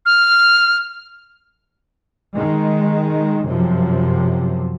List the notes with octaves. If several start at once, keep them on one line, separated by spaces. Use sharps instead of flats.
F6
D#3 G#3
F#2 C3 F3